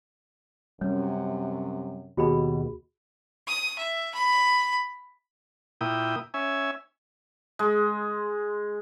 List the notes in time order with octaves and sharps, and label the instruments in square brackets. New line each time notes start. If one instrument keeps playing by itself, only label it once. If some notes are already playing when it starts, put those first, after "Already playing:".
[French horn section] F#2 C3 [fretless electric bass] G3 C#4 [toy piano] C#5
[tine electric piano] D#2 B2 [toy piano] F#4 G#4 B5
[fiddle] D#6
E5
B5
[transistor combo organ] A#2 E4 G5 D#6
C#4 E5 G#5
[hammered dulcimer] G#3